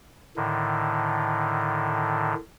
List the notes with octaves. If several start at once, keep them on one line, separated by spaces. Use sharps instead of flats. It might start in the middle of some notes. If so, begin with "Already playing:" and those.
A2 D3 D#3